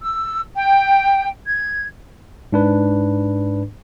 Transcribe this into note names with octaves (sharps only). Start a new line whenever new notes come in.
E6
G5
G#6
G#2 D4 B4